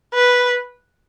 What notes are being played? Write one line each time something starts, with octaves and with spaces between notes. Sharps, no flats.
B4